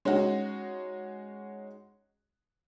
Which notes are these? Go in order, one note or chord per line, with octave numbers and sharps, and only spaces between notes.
G#3 C#4 D#4 F#4